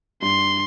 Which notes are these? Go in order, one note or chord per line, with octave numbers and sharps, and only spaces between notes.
G2 C6